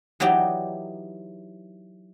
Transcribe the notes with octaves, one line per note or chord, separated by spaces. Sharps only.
E3 F#3 D#4 G4 D5